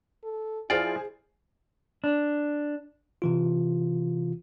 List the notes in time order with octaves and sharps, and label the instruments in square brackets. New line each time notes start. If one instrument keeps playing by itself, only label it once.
[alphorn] A4
[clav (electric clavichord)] F3 F4 D5 [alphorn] E4 [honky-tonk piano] G#4 C5
[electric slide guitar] D4
[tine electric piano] C3 E3 F4